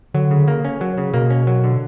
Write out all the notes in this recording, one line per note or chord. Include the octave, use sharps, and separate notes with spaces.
D3 F#3
C#3
A#3
C#4
F#3
C#3
B2 A#3
C#4
F#3
D3